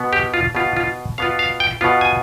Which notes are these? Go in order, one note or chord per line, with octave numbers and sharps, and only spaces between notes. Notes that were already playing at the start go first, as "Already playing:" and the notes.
Already playing: B2 B3
G4
F4
B2 B3 F4 G4
F4
B2 B3 F4 F5
F5
G5
B2 B3 F4
G#5